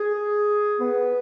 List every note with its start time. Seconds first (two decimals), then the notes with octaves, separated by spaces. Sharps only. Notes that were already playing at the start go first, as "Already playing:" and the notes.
Already playing: G#4
0.80 B3